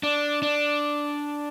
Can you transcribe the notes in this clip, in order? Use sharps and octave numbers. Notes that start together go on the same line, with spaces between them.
D4
D4